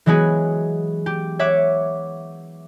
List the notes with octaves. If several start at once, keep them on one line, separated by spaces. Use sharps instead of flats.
E3 F#3 G#3 B3 F#4 G#4
G4
C#5 E5 F#5 D6